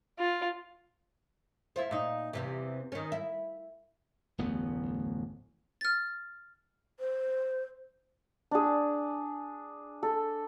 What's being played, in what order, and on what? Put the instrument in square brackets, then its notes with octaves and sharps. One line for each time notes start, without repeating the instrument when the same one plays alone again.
[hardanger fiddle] F4
[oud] E4 F4 C5
A#2 D#4
E2 C3 E3
D#3 C#4
E4
[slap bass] D1 A1 F2 B3
[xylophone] F6 A6
[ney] C5
[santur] D4 G#4
A4